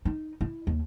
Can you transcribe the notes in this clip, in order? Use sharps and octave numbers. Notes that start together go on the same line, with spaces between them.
D#4
E4
D#2